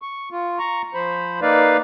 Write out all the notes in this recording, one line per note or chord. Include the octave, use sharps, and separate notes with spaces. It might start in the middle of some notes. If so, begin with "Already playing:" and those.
C#6
F4
A#5 C#6
F3 C5 B5
A#3 D#4 B4 D5 F5